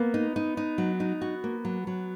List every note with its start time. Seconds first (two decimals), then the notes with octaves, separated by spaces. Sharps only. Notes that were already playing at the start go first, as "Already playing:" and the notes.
Already playing: A#3 B3
0.14 D#4
0.36 D#4
0.57 D#4
0.78 F#3
1.00 D#4
1.21 F#4
1.44 A#3
1.65 F#3
1.87 F#3